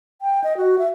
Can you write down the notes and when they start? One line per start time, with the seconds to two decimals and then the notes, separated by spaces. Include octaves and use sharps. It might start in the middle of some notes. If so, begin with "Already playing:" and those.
0.22 G5
0.44 D#5
0.57 F#4
0.78 E5